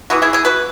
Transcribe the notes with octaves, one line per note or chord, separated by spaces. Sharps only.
E3 B3 E4 F#4
E4 G#4
E4 G#4
F#4 B4